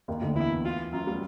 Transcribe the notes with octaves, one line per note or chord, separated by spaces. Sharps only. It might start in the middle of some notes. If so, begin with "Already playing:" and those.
D#2 D#3
D2 D3
E2 E3 E4
F4
F#2 F#3 F4
G3